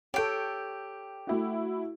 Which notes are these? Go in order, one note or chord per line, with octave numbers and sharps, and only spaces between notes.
G4 A4 C#5 G5
A3 E4 F#4